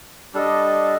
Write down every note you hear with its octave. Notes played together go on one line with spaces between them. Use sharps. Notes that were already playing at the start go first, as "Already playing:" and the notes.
G3 D4 A4 D#5